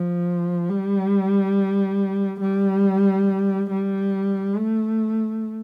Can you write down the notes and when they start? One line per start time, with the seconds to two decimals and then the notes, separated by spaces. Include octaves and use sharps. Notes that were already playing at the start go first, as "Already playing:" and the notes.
Already playing: F3
0.69 G3
2.41 G3
3.71 G3
4.57 A3